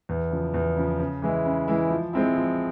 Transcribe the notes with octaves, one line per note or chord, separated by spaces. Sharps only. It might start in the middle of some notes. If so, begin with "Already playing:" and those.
E2
C#3 F3
E2
C#3 F3
C#3
E3 G#3 E4
C#3
E3 G#3 E4
F3
G#3 C4 E4
F3